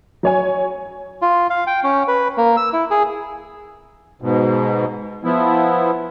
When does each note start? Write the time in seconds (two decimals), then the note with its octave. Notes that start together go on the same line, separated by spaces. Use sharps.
0.23 F#3 C#5 G#5
1.22 F4
1.50 F5
1.67 G5
1.84 C#4
2.08 B4
2.37 A#3
2.57 E6
2.73 E4
2.91 G#4
4.22 G#2 B2
5.24 F3 B3 E4